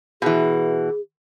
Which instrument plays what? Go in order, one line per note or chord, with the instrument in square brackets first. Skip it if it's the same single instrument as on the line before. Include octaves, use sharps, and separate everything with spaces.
[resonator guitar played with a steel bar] B2 E3 [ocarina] G#4